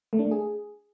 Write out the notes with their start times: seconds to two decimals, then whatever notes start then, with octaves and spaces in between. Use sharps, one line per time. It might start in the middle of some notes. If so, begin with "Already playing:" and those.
0.13 A3
0.19 D4
0.25 A3
0.31 G#4